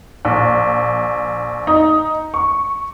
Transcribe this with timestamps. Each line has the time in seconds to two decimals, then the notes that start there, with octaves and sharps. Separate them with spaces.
0.25 A#1
1.67 D#4
2.34 C#6